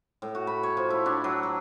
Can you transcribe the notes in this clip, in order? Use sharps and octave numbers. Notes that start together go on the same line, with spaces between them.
A2
F#4
B5
C#5
F3
E4
D4
F#3
A#5